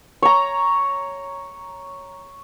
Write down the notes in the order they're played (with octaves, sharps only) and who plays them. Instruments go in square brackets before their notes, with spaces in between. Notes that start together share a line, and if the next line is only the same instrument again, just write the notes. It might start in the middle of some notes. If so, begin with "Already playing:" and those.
[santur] C#5 A#5